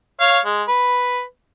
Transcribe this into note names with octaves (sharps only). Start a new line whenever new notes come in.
C#5 F5
G#3
B4